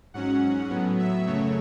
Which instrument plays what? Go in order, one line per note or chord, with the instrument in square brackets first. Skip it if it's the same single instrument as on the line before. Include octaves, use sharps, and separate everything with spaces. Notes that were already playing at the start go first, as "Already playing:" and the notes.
[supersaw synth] G#2 F#3 C#4 F#5
A2 F#3 B3
E5
F#2 C#3 F#3 A3 C#5